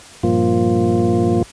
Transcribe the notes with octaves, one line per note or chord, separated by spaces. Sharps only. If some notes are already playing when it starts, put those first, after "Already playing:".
G2 A#2 F3 A#3 F4